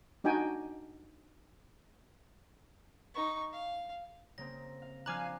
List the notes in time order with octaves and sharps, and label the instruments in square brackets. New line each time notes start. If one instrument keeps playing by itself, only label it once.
[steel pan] D4 D#4 F#4 G5 G#5
[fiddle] D#4 C#6
F5
[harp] C#3 A#3 C4 [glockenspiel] A#6
[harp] F5
[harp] F3 C4 D4 [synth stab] F5 G#5 F#6 [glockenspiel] A#5 D6